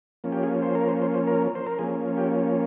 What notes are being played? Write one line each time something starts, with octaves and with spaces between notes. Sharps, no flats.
F3 A#3 C#4
G4
G#4
C5
A#4
C5
C5
C5
A#4
C5
A#4
F3 A#3 C#4 G#4
G4